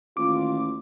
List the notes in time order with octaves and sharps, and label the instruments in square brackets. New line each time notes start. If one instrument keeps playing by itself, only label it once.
[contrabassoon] A1 [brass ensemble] D#2 [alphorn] F4 [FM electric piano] D6